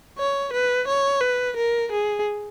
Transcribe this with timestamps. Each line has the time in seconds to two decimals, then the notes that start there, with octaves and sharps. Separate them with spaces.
0.19 C#5
0.53 B4
0.88 C#5
1.21 B4
1.56 A#4
1.91 G#4